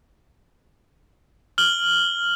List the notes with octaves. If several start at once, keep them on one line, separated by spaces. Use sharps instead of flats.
F6 F#7 G7